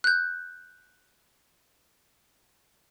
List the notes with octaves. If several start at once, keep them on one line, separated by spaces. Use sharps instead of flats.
F#6 G6